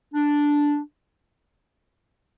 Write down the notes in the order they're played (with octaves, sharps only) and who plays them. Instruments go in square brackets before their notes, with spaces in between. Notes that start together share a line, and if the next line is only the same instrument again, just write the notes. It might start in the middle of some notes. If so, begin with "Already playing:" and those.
[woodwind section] D4